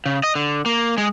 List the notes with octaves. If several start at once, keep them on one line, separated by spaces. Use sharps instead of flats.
C#3
D#5
D3
A#3
G#3